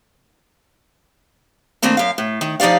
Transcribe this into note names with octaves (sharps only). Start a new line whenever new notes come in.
D#3 A3 A#3 C4 D4
F#2 F5
A2
D#3
F3 D#4 G4 D5 F5